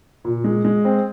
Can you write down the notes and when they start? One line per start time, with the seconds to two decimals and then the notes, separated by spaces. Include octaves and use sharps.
0.24 A#2
0.44 G#3
0.64 G#3
0.85 C4